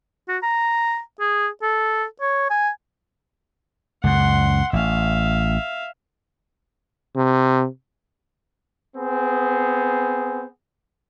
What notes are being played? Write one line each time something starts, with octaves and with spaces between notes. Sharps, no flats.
F#4
A#5
G#4
A4
C#5
G#5
C#2 F#2 F#5 C6
A1 E5 F5
C3
B3 C4 G#4